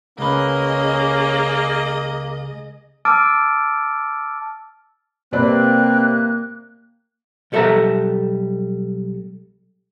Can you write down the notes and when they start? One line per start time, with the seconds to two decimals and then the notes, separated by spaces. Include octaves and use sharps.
0.18 C#2 A#3 C#4 G#4 B4 D#5
3.05 A5 D6 E6 F6 A6 D7
5.32 C3 A#3 C4 B4 D5 F#6
7.52 B1 G3 A4 C#5 E5 A#5